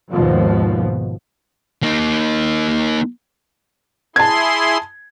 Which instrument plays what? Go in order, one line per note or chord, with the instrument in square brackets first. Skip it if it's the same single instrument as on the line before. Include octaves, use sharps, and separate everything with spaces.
[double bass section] G#1 D#2 B2 F3
[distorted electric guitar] A#3 D#4
[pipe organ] E4 G#4 C6 [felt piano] A5 G#6